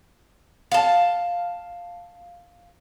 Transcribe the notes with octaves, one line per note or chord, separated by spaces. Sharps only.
F5 A5